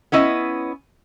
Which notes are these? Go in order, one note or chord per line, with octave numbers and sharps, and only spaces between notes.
B3 C#4 E4 D#5